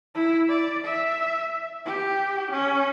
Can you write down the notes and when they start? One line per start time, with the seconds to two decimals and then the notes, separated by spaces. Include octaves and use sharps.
0.15 E4
0.49 D5
0.85 E5
1.86 G4
2.51 C#4